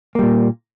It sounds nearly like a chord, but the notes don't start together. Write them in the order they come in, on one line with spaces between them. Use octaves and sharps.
A#3 G3 A#2